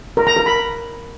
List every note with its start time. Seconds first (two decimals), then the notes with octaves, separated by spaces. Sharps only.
0.17 A#4
0.27 A#5
0.36 A#4
0.46 B5